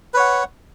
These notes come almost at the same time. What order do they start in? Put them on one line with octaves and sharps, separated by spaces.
B4 C#5 F#5